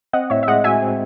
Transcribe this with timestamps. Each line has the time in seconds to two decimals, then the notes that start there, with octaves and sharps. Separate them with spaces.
0.13 C4 D#5 F#5
0.30 A2 C#5 E5
0.43 E5
0.48 G#3 D#5 F#5
0.64 F#4 E5 G#5
0.82 C4